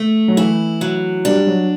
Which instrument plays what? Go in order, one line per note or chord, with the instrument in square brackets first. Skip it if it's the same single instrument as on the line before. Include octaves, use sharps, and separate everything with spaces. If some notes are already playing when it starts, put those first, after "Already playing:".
Already playing: [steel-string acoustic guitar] A3
[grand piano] F#3
[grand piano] E3 [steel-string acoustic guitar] E4
[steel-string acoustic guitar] F#3
[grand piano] G3 [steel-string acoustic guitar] D4
[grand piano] F#3